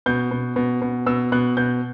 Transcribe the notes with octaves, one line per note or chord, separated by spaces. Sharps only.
B2 G6
B2
B2
B2
B2 E6
B2 F#6
B2 G6